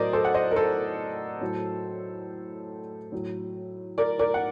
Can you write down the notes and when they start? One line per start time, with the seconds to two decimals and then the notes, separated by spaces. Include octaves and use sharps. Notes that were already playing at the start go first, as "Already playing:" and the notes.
Already playing: A2 F#3 A#4 C5 D5 D#5
0.13 A4 C5
0.25 F#5
0.34 C5 D#5
0.51 A#4
0.56 A4 C5
1.41 A2 F#3
3.12 A2 F#3
3.98 A#4 D5
4.19 A#4 D5
4.34 F#5